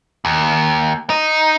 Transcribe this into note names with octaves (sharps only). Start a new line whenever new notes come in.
D#2
D#4